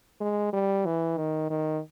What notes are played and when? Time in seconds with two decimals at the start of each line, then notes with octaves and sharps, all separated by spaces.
0.21 G#3
0.53 G3
0.86 E3
1.17 D#3
1.50 D#3